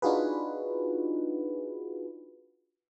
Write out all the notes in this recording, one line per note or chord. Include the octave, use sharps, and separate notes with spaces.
D4 D#4 F4 F#4 G#4 B4